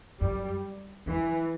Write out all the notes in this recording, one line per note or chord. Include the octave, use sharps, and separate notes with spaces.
F#2 G3
E2 E3